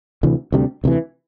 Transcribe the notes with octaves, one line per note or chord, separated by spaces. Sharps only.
D2 C3 E3
D2 C3 G3 D4
D2 C3 E3